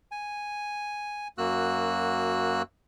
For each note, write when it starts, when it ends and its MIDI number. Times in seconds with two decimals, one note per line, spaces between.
0.11 1.28 80
1.38 2.62 42
1.38 2.62 58
1.38 2.62 66
1.38 2.62 88
1.38 2.62 90